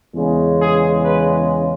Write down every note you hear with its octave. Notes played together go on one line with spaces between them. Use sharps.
E2 C#3 G#3
G#4
B4